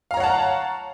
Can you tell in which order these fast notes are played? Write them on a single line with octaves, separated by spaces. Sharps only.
F5 A#5 C#5 F#5 A5